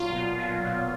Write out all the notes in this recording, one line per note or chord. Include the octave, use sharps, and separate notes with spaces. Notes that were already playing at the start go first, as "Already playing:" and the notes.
Already playing: A#2 F#3 F4
B2
F#3
B2